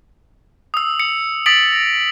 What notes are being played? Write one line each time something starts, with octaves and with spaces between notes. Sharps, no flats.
D#6 E6
C#7
D#6 A6 B6 D7 F#7
A#6